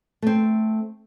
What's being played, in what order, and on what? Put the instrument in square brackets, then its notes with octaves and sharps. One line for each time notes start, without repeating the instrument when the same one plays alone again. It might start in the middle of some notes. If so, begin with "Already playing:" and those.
[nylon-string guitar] A3 C4